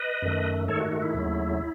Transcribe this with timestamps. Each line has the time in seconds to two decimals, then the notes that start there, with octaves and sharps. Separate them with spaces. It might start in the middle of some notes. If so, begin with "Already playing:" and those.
Already playing: B4 D#5
0.22 F#2 D#3 A3
0.68 G#2 D#3 A3 A4 C#5
0.80 F#4
0.92 F#4
1.02 E4
1.14 D#2 C#3 F#3 A3